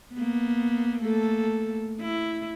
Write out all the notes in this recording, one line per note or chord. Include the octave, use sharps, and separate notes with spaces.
A#3 B3
A3 A#3 A4
E4